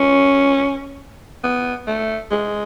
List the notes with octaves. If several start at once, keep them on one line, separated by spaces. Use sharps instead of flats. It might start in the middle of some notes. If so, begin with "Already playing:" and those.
Already playing: C#4
B3
A3
G#3